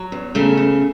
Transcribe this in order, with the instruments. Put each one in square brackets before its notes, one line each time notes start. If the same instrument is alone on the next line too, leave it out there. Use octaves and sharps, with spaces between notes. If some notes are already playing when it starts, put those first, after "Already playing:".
Already playing: [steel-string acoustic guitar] F#3
E2
C#3 A3
A3